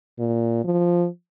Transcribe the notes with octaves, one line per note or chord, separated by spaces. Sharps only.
A#2
F3